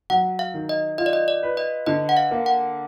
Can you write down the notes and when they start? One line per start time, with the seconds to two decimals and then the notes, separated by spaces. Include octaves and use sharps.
0.10 F#3 F#5
0.39 F5
0.54 D#3
0.69 D#5
0.98 F4 D#5
1.06 D5
1.13 D#5
1.28 D5
1.43 B4
1.57 D#5
1.86 D3 D#5
2.09 F#5
2.17 F5
2.31 A#3
2.46 F#5